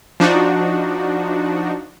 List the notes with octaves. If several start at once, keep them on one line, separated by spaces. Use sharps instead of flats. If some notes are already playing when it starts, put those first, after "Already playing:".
F3 D4 D#4 F#4